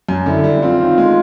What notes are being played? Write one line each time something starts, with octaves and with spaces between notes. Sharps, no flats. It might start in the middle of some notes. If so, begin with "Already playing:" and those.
F#2
D3 E4
G3
C4 F4
D#3
G#3